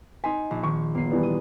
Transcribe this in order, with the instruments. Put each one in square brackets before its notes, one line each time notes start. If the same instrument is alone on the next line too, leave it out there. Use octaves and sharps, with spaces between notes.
[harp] D#4 C6 B6 [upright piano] G#5
[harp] A#1
[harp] D#3 [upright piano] C#6
[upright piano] G1 [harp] A#3 C7
[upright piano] E3 G3 B3
[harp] D#6